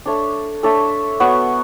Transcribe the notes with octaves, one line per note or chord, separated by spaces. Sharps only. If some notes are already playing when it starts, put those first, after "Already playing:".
D4 A4 C#5 E5
D4 A4 C#5 E5
B3 F#4 C#5